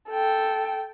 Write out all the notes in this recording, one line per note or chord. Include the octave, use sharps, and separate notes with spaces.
A4 G5